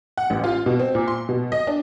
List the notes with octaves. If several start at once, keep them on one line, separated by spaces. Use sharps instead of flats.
F#5
A1
F4
B2
C4
A#2
C6
B2
D#5
D4